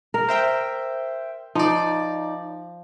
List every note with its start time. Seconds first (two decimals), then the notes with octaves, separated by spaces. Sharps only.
0.14 A#4
0.28 C5 E5 G5
1.55 F3 D#4 D5